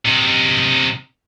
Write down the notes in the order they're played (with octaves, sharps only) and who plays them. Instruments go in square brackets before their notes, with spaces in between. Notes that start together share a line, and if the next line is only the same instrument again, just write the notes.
[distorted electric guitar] C3 D#4